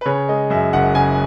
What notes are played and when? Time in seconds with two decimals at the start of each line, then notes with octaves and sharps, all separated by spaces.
0.01 B4
0.05 C#3 C#5
0.28 G#3 D#5
0.50 F#2 E5
0.73 F#1 F#5
0.95 C#3 G#5